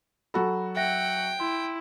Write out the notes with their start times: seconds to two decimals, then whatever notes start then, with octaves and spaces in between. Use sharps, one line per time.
0.34 F#3 F#4 A4 B5
0.76 E5 F#5 G5 A#6
1.40 E4 C6